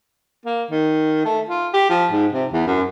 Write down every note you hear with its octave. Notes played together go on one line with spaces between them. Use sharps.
A#3
D#3
A3
F4
G4
F3
G#2
C3
E2
F#2